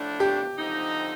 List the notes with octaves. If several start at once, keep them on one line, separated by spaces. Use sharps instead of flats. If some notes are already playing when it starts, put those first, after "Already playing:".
Already playing: A2 F3 A3 D4
G4
D3 F3 C4 D#4